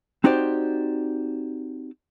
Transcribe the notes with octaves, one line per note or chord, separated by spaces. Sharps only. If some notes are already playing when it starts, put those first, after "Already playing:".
C4 D#4 F#4 G4 C5 D5